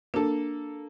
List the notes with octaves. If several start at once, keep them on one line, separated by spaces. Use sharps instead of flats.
A#3 D4 A4